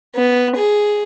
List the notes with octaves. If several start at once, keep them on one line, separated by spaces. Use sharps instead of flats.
B3
G#4